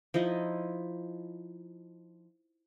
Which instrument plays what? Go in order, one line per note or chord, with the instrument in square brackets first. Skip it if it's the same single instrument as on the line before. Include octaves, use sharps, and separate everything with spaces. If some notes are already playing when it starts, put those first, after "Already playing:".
[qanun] F3 D#4 E4 D#5